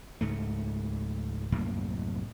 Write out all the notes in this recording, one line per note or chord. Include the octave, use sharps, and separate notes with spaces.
C#2 G#2 A3
C2 F#2 A2 A#3